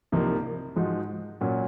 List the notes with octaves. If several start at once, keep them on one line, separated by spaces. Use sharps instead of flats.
C2 C3 F3 A#3 D#4
G#2 F3 G#3 D#4 F#4
A#2 F#3 C#4 F#4